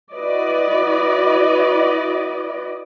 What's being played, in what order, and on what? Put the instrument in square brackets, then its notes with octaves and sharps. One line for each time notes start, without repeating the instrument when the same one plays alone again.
[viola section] E4 F#4 B4 D5 D#5